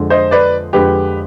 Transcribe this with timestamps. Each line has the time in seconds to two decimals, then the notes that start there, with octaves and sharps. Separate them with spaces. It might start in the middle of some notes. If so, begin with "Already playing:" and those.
Already playing: F2 D3 G#3
0.10 C5 D#5
0.31 B4 D5
0.73 F2 D3 G#3 G4 B4